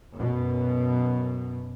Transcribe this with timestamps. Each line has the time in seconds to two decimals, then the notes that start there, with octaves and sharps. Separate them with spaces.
0.14 F#2 B2